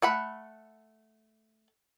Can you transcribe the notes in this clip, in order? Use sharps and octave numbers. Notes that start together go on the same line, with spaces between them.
A3 F#5 B5